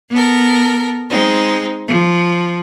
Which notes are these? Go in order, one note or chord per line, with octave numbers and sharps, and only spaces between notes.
B3 A4 A#4
G#3 C4 D#4
F3